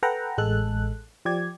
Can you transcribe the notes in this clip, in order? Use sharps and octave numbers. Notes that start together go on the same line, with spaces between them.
A4 B4 F#5 G5 A#5
A1 G#3 A4 F#6
F3 G4 D5 G#6